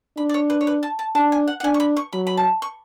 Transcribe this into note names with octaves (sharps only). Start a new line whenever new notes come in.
D4 B5
D5
C#5
B4
C#5
B4
A5
A5
D4 A5
G#5
F#5
F#5
D4 G#5
C#6
B5
C#6
F#3 B5
B5
A5
C#6